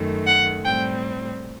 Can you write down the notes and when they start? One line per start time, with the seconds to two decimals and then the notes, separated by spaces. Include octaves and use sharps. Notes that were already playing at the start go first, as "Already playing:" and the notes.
Already playing: F#2 D#3 A3
0.26 F#5
0.65 A2 G3 C4 G5